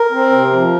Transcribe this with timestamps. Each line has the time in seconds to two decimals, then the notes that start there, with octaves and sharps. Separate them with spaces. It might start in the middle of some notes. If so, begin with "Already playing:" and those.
Already playing: A#4
0.12 C4
0.32 C3
0.52 F3